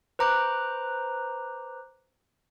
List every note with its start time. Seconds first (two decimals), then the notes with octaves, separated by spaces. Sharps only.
0.19 B4 C5 A#5 D6 F#6